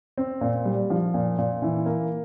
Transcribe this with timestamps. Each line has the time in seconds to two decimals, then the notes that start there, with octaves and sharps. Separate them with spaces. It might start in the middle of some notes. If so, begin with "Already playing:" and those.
0.18 C4
0.41 A#2
0.65 G3
0.90 F3
1.14 A#2
1.38 A#2
1.62 E3
1.86 A#3